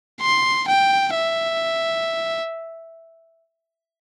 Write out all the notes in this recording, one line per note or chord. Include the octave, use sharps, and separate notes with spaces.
C6
G5
E5